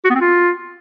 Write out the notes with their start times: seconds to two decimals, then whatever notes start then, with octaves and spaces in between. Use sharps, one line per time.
0.05 F#4
0.10 B3
0.15 C4
0.20 F4